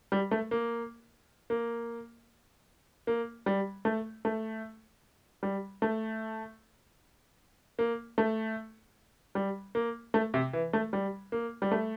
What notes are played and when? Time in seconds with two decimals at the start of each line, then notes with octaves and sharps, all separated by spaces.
0.12 G3
0.31 A3
0.51 A#3
1.50 A#3
3.07 A#3
3.46 G3
3.85 A3
4.25 A3
5.43 G3
5.82 A3
7.79 A#3
8.18 A3
9.35 G3
9.75 A#3
10.14 A3
10.34 C3
10.53 E3
10.73 A3
10.93 G3
11.32 A#3
11.62 G3
11.71 A3